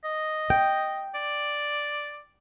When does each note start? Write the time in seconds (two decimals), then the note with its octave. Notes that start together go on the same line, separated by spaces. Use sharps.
0.04 D#5
0.50 G5
1.15 D5